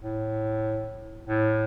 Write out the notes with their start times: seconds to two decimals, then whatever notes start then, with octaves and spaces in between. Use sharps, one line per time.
0.02 A2
1.27 A2